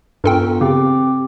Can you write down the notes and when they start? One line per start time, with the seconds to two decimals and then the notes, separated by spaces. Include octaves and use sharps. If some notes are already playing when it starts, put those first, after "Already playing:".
0.24 G2 B3 F4 A4 A#4 G5
0.61 C#3 C4 G4 D6